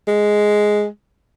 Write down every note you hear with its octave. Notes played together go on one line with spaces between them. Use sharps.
G#3